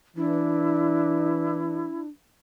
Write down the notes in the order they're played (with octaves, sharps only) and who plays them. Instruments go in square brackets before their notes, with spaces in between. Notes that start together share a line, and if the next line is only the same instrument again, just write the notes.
[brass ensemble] E3 [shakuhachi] D4 [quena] E4